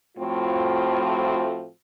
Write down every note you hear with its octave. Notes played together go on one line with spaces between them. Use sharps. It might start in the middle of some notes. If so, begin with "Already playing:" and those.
A2 F3 A3 C4 F4 F#4